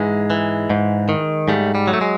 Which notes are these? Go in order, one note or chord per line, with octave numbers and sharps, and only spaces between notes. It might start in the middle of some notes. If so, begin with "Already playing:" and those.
Already playing: G#2 E3 G#3
E3
G#2
D#3
G#2 G3 A3
G3
F#3
A3
G#3